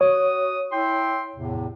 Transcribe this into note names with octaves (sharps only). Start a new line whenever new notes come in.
F#4 C#5 D#6
E4 G5 C6
E2 A2 C3